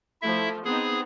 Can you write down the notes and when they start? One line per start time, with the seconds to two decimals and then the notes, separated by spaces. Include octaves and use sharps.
0.22 F3 A3 E4 E5
0.65 B3 C4 D#4 G#4